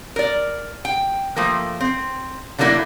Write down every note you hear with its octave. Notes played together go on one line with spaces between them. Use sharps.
A#4 D5
G5
F3 A3 A#3
C4
D3 F#3 A3 A#3 D4 E4